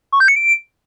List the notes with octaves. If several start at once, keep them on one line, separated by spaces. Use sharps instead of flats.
C#6
G6
C#7
D7